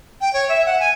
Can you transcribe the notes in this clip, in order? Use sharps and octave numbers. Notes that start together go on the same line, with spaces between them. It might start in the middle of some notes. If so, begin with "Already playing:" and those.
G5
C#5
E5
F#5
G#5